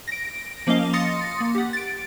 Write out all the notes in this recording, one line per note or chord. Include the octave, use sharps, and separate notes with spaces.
A#6 D7
F3 A#3 C#4 D#5 F5
C6 D#6 A6 A#6 C#7
A#3
G4 F#5
A6 D7